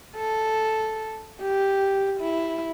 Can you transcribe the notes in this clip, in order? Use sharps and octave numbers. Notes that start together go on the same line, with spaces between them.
A4
G4
E4